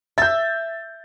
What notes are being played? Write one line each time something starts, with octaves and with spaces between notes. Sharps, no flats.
E5 G6 A6